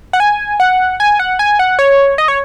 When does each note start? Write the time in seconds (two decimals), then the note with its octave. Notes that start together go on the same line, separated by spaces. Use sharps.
0.13 F#5
0.20 G#5
0.60 F#5
1.00 G#5
1.19 F#5
1.39 G#5
1.59 F#5
1.79 C#5
2.18 D#5
2.28 C#5